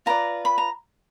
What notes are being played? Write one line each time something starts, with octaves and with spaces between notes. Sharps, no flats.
F4 B4 D5 A#5
B5
A#5